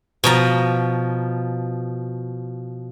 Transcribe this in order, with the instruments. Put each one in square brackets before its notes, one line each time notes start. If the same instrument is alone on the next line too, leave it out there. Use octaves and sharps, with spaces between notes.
[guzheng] B2 F3 A#5